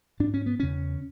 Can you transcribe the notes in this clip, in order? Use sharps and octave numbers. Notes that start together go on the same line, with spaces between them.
G#2 D4
C#4
B3
E2 C#3 C#4